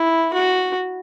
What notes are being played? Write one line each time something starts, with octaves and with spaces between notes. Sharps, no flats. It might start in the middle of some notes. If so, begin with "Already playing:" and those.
Already playing: E4
F#4